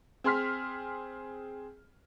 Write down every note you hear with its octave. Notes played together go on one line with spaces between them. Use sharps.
C4 G#4 C6 F6 B6